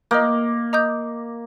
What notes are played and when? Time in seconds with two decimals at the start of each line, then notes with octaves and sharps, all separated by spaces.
0.11 A#3 D#5 A#5 D#6 G6
0.73 D#5 A#5 D#6 G6